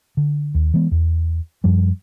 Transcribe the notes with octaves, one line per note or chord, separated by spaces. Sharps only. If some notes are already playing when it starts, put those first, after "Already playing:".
D3
D#2
E3 G#3 B3
E2
F#2 F3 G3